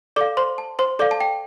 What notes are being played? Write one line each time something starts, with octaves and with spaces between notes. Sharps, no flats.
A4 D5 F5 D6
C5 C6
A5
C5 C6
A4 D5 F5 D6
A5
G5